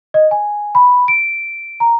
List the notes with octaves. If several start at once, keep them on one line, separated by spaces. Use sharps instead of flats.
D#5
G#5
B5
D7
A#5